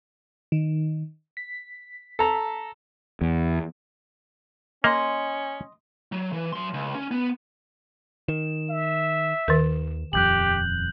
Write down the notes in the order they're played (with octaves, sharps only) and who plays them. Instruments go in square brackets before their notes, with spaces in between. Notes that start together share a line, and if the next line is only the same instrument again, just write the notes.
[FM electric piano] D#3
B6
[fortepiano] A4 A#5
[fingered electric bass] E2
[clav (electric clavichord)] A#3 [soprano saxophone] C#4 [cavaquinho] D#5 C6
[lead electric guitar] F#3
E3
F#3 C6
C#2
C#4
B3
[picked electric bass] D#3 [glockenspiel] E7
[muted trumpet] E5
[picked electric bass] D#2 [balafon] D#3 A#4
[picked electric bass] D#1 F2 [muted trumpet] G4 [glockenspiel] F#6 G6 F#7